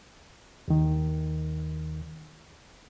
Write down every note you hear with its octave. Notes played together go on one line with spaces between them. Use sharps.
D#2 D#3